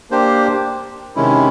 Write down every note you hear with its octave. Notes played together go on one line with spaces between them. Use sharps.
A#3 D4 G4 C5
C3 D#3 G#3 C#4 E4